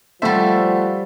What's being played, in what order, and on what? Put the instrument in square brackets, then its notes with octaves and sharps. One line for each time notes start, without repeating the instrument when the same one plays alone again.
[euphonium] F3 [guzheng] G3 C5 [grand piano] A3 E5 [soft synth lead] F#5